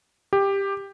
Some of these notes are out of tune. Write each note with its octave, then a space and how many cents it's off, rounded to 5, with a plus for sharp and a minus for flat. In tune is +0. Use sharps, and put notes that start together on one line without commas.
G4 +10